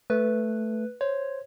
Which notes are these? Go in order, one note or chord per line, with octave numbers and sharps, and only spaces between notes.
A3 B4
C5 C#5